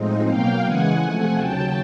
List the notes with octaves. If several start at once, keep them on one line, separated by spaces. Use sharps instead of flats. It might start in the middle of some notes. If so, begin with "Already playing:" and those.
Already playing: A2 F3 G#3 C4 D#4
B2 F#3 A#3 F5 G5
C#3 E3 G#3 F#5 G#5
C3 F3 A3 F#5 G#5
D#2 C#3 F#3 G5 A5